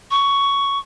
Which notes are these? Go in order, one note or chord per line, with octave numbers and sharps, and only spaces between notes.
C#6